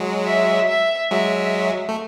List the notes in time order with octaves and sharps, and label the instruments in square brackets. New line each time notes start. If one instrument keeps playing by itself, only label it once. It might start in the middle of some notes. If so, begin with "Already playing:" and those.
Already playing: [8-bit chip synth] F#3 G#3
[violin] E5
E5
[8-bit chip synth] F#3 G#3 [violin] E5
[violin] E5
[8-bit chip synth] A3